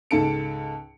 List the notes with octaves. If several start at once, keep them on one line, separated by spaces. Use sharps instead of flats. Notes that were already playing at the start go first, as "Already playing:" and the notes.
C#2 G#2 A4 A5 C#7 D7